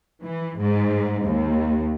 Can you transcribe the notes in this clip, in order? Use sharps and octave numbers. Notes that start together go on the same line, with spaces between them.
E3
G#2
D#2